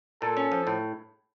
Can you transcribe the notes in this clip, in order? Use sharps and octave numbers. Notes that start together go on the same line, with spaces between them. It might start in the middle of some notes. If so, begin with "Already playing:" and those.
A#2 A4
C#4
F3
A2